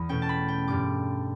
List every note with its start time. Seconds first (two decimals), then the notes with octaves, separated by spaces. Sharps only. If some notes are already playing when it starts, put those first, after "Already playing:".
Already playing: E2 B5
0.09 B2 A3 C#4 G5
0.22 A5
0.29 B5
0.48 G5
0.68 G2 D3 G3 D6